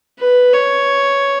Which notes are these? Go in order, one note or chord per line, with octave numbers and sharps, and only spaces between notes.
B4
C#5